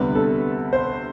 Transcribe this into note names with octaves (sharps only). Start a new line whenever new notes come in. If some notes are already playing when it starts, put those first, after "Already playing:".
Already playing: D2 C3 G3 B3 B4
A4
C5